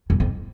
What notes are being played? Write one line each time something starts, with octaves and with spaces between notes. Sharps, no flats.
F#2
F2